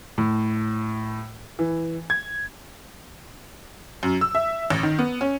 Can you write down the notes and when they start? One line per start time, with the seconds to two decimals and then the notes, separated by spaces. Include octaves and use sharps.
0.18 A2
1.59 E3
2.10 G#6
4.03 F#2
4.21 E6
4.35 E5
4.70 A1
4.83 D#3
4.99 B3
5.21 C#4